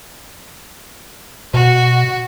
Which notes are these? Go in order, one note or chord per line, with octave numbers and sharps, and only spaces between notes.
B2 F#4